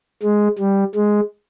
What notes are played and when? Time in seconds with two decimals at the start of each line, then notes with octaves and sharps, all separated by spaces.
0.23 G#3
0.59 G3
0.95 G#3